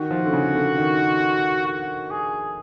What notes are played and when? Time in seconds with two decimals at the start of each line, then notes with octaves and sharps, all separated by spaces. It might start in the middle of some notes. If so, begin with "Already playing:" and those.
Already playing: D#3 F#4
0.11 F3
0.26 D3
0.33 C#3
0.56 D3
0.78 D#3
1.67 F#4
2.11 G#4